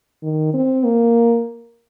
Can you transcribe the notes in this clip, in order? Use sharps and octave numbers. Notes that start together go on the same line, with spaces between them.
D#3
C4
A#3